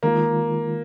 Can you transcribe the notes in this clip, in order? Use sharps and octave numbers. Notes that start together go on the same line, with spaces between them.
D#3 G#3 A#3 F4